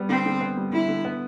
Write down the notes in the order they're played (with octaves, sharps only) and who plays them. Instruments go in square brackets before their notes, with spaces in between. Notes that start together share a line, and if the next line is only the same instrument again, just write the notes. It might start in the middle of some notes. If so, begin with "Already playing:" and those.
Already playing: [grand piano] G3 B3
[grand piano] D3 [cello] C4
[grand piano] D3
B3
G3
[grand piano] D3 [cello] E4
[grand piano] D3
B3